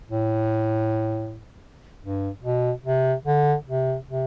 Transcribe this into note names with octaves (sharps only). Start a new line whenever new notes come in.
A2
G2
B2
C3
D3
C3
C3